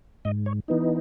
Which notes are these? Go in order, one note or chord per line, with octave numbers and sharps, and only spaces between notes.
G#2 D#5
C#5
E3 B3 D#4